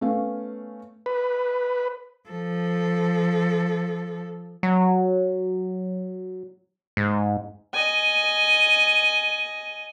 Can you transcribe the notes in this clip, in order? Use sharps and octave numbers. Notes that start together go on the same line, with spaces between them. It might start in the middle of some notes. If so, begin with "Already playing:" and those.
A3 B3 C#4 F5
B4
F3 A4
F#3
G#2
D#5 G#5